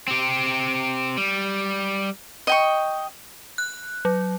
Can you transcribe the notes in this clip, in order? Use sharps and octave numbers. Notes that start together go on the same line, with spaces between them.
C4 G4
G3
D#5 G5 C#6
F#6
F#3